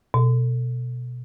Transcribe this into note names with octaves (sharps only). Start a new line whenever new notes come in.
B2